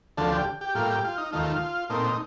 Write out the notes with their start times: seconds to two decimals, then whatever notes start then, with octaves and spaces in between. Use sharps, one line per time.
0.17 D2 D3 F3 A3 A4
0.32 G4
0.61 G4
0.75 A2 G3 A#3 F4
0.90 G4
1.04 F4
1.18 D#4
1.33 D#2 D#3 A3 F4
1.90 A#2 A3 C4 D#4
2.05 D#4